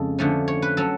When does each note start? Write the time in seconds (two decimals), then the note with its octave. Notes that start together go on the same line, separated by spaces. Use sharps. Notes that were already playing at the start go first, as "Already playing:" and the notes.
Already playing: F2 C#3 G#3 A4
0.19 D3 F3 A3 C#4
0.48 C#5
0.62 B4
0.77 F#3 C#4 A4